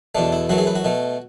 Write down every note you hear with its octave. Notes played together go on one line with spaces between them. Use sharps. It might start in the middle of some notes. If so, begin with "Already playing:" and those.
E2 B2 A3 D4
E4
F#2 E3 A3 F#4
G#4
B4
F#4
B2 A3